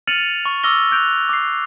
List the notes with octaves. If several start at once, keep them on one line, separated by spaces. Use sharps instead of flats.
F6 A6 C#7 D#7 F7 F#7
C#6
C#6 D6 E6 F6 A#6 G7
F#6 G6 D7 F7
D6 C7